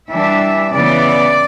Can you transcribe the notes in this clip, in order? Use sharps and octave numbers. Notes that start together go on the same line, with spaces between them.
E3 G3 D4 E5
C#3 E3 B3 D5